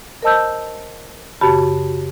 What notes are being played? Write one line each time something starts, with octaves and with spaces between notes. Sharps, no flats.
A#4 C5 D#5 A5 E6 G6
F#2 C#3 F#4 G4 A5 B5